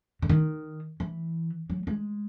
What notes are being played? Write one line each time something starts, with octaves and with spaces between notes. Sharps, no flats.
D3
D#3
E3
F#3
G#3